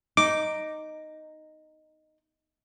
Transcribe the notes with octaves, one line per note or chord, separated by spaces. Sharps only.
D#4 D6